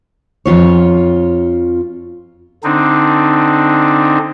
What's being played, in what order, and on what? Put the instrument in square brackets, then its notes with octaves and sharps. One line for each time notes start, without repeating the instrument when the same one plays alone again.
[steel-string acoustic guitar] F2 G#2 F4 C#5
[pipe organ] D3 C4 D4 D#4